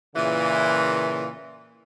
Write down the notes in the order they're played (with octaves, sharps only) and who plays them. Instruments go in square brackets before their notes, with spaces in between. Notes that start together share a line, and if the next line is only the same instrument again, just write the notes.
[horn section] A#2 C#3 E3